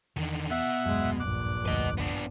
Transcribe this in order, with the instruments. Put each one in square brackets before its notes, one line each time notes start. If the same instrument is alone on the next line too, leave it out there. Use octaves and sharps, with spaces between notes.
[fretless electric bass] E2 [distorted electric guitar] D3 D#3
[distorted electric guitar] B2 [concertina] E5 F#5
[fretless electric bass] D#1 F#2 [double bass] G#3
[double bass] A#1 G2 [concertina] D6 F#6
[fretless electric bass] F1 D2 [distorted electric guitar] B4 D#5
[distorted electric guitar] B3 D4